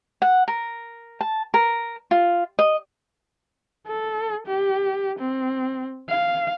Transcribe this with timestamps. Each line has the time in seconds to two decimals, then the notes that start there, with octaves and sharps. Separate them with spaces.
0.22 F#5
0.48 A#4
1.21 A5
1.54 A#4
2.11 F4
2.59 D#5
3.87 A4
4.47 G4
5.19 C4
6.09 F5